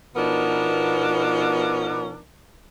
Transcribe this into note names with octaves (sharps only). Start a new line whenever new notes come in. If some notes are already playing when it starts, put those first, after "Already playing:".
B2 F3 B3 D4 D#4 A#4